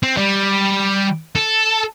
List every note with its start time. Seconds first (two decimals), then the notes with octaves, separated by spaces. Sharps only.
0.03 C4
0.17 G3
1.35 A4